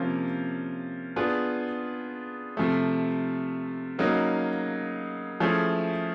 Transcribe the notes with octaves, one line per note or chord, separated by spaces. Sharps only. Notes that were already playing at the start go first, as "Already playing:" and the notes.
Already playing: C3 F3 A#3 C#4
B3 D4 F4 G#4
C3 F3 A3
C#3 F#3 A#3 D#4
F3 A3 C#4 E4 G#4